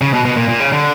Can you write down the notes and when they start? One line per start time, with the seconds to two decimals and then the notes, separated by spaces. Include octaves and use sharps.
0.01 C#3
0.14 B2
0.25 B2
0.37 A#2
0.49 A#2
0.60 C#3
0.72 D3